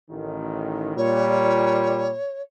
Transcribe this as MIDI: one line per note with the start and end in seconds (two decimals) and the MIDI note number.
0.11 0.97 33
0.11 0.97 51
0.97 2.14 46
0.97 2.10 55
0.97 2.41 73